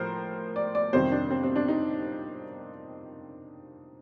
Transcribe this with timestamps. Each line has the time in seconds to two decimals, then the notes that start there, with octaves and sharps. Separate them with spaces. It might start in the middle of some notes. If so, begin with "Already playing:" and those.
Already playing: A2 F3 A#4 C5
0.56 D5
0.75 D5
0.93 F2 C3 D#3 G3 C5
1.12 D4
1.30 C4
1.43 C4
1.56 D4
1.68 D#4